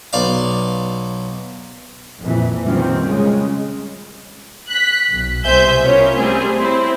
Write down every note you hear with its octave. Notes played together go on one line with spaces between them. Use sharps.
B1 D5 F5
F2 A#2 E3
D#3 G3 C4 C#4 F4
C#3 G#3
F#6 B6
B1
C2 B2 C5 E5 G#5 G6
B3 C#4 F4 A#4 C#5
G3 A3 C4 G#4
C4 E4